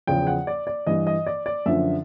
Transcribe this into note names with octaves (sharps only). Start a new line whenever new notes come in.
E2 C#3 F3 G5
F#5
D5
D5
G2 E3 D#5
D#5
D5
D5
F#2 D3 F3 E5